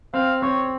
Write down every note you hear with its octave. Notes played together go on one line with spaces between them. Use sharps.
C4 F5
C4 C#5